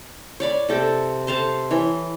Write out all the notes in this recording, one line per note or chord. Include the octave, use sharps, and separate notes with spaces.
C#5 D5 B5
C3 A4 G5
A4 C5 F5 A5
E3 C#5